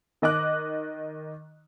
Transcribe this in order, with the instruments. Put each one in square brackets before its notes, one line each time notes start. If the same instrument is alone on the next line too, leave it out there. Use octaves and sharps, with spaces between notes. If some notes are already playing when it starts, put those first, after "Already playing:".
[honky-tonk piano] D#3 D#5 D6 F#6